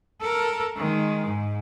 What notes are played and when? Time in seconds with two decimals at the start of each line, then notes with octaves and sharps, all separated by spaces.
0.21 A4 A#4
0.76 D#3 G#3
1.26 G#2